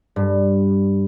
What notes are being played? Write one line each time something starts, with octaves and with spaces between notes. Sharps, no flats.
G2